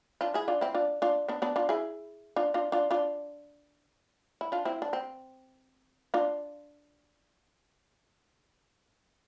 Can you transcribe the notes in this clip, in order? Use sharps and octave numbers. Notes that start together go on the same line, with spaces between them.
D4 F4
E4 G#4
D4 F4
C4 E4
D4 F4
D4 F4
B3 D4
B3 D4
D4 F4
E4 G#4
D4 F4
D4 F4
D4 F4
D4 F4
E4
D4 F4
C4 E4
D4
C4
D4 F4